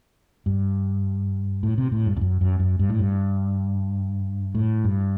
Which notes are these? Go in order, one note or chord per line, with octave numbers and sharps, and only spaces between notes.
G2
A2
C3
A2
G2
E2
F#2
F#2
F#2
G2
A2
G2
A2
G2